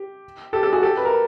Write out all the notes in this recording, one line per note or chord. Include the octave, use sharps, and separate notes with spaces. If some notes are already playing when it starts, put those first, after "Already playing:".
Already playing: G4
G4 A4
G4 A4
F#4 G#4
G4 A4
B4
A#4